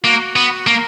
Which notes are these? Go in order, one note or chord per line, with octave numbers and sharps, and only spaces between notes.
A#3 F#4
B3
A#3 A#4